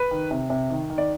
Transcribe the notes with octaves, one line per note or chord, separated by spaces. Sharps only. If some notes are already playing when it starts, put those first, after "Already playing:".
Already playing: B4
D#3
C3
C3
D#3
D#3
D5